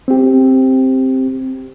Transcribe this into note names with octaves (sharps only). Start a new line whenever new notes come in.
C4 G4